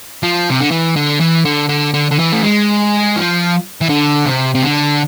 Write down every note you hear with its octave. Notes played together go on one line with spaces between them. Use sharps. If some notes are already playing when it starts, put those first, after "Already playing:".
F3
C3
D3
E3
D3
E3
D3
D3
D3
D3
E3
A3
G#3
F3
E3
D3
C3
C3
D3